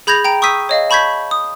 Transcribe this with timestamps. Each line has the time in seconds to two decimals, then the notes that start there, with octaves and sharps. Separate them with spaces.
0.07 G#4 B5 G6 G#6 A#6 F7
0.24 G5 A#5 D7
0.42 C#6 D#6 E6 G6 B6 D#7
0.69 C#5 D#5 F5
0.90 A5 B5 C#6 G6 G#6 B6
1.31 D#6